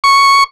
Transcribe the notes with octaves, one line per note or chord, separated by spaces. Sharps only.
C#6